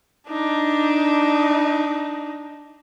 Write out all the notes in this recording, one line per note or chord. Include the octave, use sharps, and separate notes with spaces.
D4 D#4